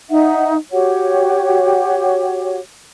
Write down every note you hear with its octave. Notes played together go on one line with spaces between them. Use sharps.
D#4 E5 F#5
F#4 G4 C#5 F#5